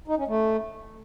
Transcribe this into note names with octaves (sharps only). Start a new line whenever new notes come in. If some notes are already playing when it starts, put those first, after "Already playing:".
D#4
C#4
A3